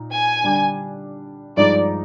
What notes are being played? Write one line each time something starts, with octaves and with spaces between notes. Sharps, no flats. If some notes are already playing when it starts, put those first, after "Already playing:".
Already playing: A#2 D#4
G#5
D3 G3 D4
G2 F3 G#3 D#4 D5